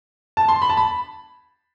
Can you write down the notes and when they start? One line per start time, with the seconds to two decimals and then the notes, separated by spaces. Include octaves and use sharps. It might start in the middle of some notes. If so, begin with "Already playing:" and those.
0.37 A5
0.48 C6
0.62 B5
0.70 A5
0.77 B5